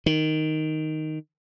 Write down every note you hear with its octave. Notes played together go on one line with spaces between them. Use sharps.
D#3